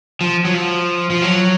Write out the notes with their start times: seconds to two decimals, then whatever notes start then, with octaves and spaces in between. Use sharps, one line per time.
0.21 F3
0.45 F#3
0.54 F3
1.10 F3
1.22 F#3